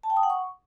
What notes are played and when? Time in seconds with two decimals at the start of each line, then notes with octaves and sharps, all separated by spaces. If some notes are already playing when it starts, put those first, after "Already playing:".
0.03 A5
0.10 G5
0.17 D#6
0.23 F#5
0.30 C#6